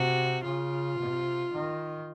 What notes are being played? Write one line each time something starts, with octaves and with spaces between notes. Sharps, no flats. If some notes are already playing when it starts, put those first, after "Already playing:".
Already playing: C3 F#4
C#3 F4
C3
D#3